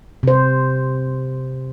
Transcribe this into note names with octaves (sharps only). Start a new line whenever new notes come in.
C3 C5